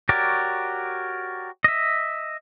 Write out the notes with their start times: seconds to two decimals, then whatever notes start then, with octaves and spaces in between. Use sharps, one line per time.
0.09 F#4 G4 A#4 C#5 D5
1.64 D#5 E5